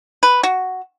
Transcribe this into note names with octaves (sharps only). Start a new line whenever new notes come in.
B4
F#4